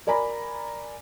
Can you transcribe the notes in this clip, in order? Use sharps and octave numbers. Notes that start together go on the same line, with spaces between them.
A#4 D5 G#5 A#5 B5